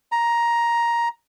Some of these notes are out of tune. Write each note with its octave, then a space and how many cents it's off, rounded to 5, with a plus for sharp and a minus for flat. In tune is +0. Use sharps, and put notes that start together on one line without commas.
A#5 +10